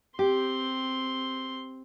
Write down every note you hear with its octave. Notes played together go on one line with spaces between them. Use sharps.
C4 G4 C6